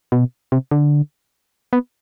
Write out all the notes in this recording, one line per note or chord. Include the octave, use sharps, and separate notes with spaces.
B2
C3
D3
B3